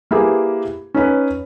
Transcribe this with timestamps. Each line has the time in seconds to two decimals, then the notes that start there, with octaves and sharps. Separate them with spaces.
0.11 A#3 E4 G4 G#4 B4
0.94 C#4 D#4 B4 C#5